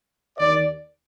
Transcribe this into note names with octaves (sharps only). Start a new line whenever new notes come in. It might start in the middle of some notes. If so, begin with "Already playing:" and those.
D#2 D#3 D5